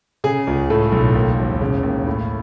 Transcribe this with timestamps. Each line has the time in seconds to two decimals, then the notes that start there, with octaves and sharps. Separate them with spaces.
0.24 C#3 G#4
0.47 C#2
0.70 A2 A4
0.92 B1
1.15 D#2
1.39 E1
1.61 C#3
1.83 D#2
2.06 A2